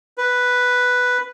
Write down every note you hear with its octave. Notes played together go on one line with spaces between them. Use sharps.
B4